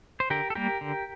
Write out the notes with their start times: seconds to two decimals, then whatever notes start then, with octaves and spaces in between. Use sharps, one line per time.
0.20 C5
0.30 D3 G4 A#4
0.50 A4
0.55 G3 A#3 G4 A#4
0.81 D3